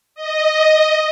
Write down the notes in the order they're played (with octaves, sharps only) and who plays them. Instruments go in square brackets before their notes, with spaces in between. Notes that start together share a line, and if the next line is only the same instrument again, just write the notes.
[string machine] D#5